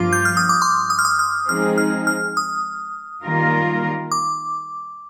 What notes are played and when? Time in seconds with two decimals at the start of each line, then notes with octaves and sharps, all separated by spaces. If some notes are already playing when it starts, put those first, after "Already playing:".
Already playing: G2 F3 A#3 F4 D6
0.13 G6
0.25 F6
0.37 D#6
0.49 D6
0.62 C6
0.90 D#6
0.99 F6
1.05 D#6
1.19 F6
1.49 F3 G#3 C4 D#4 G#4 F6
1.78 F6
2.07 F6
2.37 D#6
3.23 D#3 G3 A#3 F4 A#4
4.12 D6